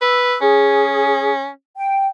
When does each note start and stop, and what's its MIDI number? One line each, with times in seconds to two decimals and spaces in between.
0.01 0.36 71
0.01 0.40 88
0.41 1.49 61
0.41 1.30 68
1.77 2.07 79